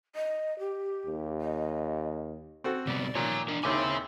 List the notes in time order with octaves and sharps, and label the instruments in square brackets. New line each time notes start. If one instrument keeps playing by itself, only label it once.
[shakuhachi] D#5
G4
[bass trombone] D#2
[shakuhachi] D#5
[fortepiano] C4 F#4 A4
[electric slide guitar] C3 G3 B3 [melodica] D5
[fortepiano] A#2 D#3 [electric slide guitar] C#5 A#5
[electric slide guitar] D4 A#4
[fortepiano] D#2 D#3 D6 [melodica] C4 E4 [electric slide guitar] G#4 C#5 G#5